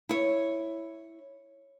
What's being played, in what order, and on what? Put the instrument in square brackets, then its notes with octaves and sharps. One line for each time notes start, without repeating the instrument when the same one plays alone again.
[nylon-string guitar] E4 C#5